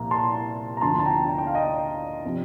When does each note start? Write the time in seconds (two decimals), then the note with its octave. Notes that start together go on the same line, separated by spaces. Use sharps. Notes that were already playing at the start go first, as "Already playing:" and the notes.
Already playing: C2 A#2 F3 A#5
0.11 A5 C6
0.77 A#5
0.81 D2 D3 F3 A5 C6
1.00 A5
1.06 G5 A#5
1.30 A5
1.38 G5
1.47 F5
1.55 D#5 G5
2.25 C3 F3